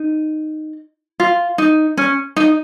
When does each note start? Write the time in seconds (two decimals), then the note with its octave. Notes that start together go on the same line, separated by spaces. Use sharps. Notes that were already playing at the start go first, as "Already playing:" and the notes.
Already playing: D#4
1.20 F4
1.58 D#4
1.97 C#4
2.36 D#4